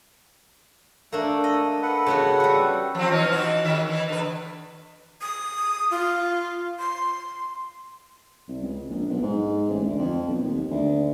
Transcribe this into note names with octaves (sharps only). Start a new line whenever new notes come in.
A3 A#3 D4 A4
D#5
A4 B4 F#5
C#3 B3 F#4
G3 F#4
F3 C4
E3 C#4 D#4
E3 E4 F#4
D#3 E5
E3 E4
D3 B4
D#6
F4
C6
C2
C#2
A#1
B1
G#2
A1
D2
F2
B1
D#2
D2